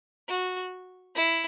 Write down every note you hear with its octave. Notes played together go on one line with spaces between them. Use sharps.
F#4
E4